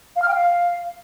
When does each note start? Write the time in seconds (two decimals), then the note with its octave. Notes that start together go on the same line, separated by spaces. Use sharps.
0.16 F5
0.22 F6
0.28 G5
0.34 F5